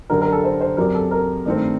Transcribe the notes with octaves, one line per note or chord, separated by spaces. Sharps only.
F#2 D3 G3 A#4
A#4
A4
C5
C5
F#2 F#3 C4 G4 A#4 D5
A4
A#4
G2 D#3 A3 C4